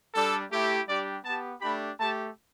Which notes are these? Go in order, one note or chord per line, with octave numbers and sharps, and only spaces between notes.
G3 D4 G4 A4
A3 E4 G4
G3 D4 G4 D5
B3 G4 A5
A3 D4 G4 B5
A3 G4 A5